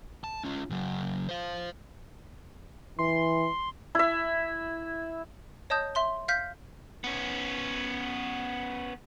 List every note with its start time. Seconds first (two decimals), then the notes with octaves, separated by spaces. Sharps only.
0.24 A5
0.44 C#4 F4
0.71 C#3 F#3
1.29 C5 F5
2.99 E3 C6
3.95 E4 E5
5.70 C#5 D#5 A5 D#6 G6
5.95 E5 C6 G7
6.28 F5 F6 G6 B6
7.04 B3 C#4